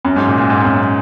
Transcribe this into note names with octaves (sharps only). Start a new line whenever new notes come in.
F#2
G#2
A#2
A#2
G#2
F#2